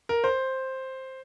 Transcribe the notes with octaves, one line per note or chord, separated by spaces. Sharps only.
A#4
C5